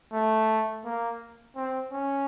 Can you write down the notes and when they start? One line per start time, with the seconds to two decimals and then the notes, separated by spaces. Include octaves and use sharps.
0.13 A3
0.84 A#3
1.56 C4
1.91 C#4